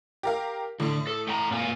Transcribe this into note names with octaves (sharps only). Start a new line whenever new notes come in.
G4 A#4 F5
A2 D3
A4
A3 G5 A#5
A#2 F4 G#5